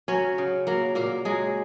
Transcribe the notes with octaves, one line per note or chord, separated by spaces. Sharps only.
F#3 C#4 C#5
C#3
F#3 A#3 A#4
A#2 A#3 A#4
F#3 G#3 G#4